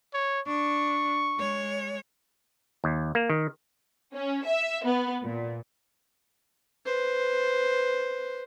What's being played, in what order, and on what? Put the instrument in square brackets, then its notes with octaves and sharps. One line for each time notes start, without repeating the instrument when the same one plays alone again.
[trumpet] C#5
[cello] D4 [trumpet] C#6
[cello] G#3 C#5
[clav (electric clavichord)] D#2
A#3
D#3
[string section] C#4
E5
B3
A#2
[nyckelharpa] B4 C5